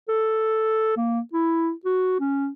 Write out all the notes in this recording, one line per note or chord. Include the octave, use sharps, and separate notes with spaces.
A4
A#3
E4
F#4
C#4